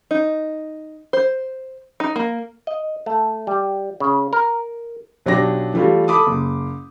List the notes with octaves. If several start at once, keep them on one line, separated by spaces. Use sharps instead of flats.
D#4
C5
D#4
A#3
D#5
A3
G3
C#3
A#4
B1 F#3 D4 G4 A#6
E3 G3 A3 F4 F#4
A4 B5 D6 D#6
F#1